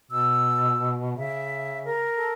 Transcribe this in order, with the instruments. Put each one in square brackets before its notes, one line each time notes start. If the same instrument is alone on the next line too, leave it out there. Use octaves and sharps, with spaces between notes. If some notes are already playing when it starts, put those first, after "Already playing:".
[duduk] B2 [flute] E6
[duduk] C#3 [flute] E5
[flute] A#4
[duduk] A4